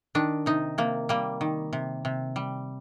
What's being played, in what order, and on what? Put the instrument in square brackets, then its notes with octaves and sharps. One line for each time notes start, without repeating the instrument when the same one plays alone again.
[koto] D#3 D4
C3 D#4
C3 A#3
G3 A#3
D#3
C3
C3
G3